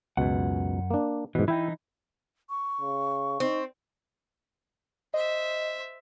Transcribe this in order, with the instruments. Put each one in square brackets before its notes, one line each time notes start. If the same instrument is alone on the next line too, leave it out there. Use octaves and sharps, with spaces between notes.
[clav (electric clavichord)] C#2 B2 [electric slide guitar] F#2 F#5
[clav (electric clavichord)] A#3 D4
[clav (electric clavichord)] G#2 B2 [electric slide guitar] E3
[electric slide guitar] E3 D#4 [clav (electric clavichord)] E4 E5 G5
[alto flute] C#6
[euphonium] C#3
[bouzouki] C4 [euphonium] D#4
[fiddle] C5 E5 [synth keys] D#5